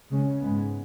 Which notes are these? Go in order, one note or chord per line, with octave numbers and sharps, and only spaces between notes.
C#3 G#3 C#4
G#2 G#3 B3